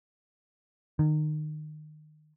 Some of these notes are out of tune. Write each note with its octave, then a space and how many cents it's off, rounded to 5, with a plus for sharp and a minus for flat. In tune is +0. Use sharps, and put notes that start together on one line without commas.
D#3 -30